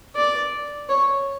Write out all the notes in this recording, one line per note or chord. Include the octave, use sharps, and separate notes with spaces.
D5
C#5